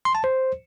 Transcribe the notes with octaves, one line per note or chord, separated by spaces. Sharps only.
C6
A5
C5